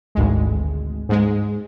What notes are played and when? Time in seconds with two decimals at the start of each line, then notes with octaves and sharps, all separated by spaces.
0.15 G#1 D2 G#3
1.09 G#2 G#3